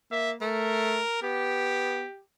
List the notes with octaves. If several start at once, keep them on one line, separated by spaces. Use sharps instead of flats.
A#3 E5
A3 A#4
B3 G4